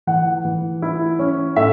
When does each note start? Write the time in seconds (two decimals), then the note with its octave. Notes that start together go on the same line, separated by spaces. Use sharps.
0.07 E3 F#5
0.45 E3
0.82 E4
1.19 C#4
1.56 A2 E5